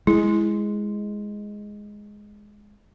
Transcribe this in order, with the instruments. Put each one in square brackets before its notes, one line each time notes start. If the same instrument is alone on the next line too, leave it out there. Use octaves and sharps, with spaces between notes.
[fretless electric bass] G#3 [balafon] E4